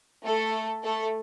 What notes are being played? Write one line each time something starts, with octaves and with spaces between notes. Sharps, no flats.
A3 A4
A3 A4